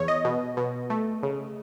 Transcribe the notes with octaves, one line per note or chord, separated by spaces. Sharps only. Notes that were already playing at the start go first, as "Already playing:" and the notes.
Already playing: E2 C#5
D#5
B2
B2
A3
C#3